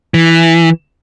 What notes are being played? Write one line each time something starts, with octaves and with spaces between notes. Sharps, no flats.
E3